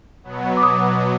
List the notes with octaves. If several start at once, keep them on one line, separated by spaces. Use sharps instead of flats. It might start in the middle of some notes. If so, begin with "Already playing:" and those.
B2 F#3 B3
D6
D#6